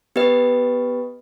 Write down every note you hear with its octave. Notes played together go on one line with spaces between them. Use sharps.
B3 G4 B4 D#5